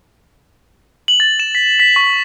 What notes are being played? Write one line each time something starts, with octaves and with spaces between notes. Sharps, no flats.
F#7
A6
E7
B6
B6
C#6